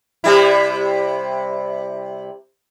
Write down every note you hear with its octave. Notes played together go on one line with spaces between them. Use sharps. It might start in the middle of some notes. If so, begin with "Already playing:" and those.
C3 G3 E4